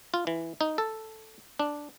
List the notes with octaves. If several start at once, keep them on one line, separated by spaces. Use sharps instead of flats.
F4
E3
D#4
A4
D4